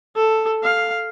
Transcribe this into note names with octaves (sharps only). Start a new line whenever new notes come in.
A4
F5